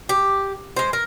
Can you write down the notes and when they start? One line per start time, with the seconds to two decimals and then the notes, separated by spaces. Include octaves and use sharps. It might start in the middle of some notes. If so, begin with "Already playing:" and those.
0.09 G4
0.76 G#3 C5
0.93 A#4